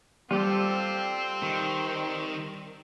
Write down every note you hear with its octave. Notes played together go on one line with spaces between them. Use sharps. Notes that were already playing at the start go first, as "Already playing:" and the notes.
G3 C4 F4 G4 A4 C5
D#3